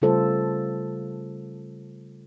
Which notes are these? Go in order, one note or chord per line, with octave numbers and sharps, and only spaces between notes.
C#3 G3 A3 F4 A4 C5